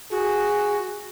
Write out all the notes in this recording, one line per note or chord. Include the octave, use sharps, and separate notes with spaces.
F#4 G#4